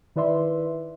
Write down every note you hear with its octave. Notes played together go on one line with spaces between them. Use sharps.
D#3 E4 B4 D5 E5 C6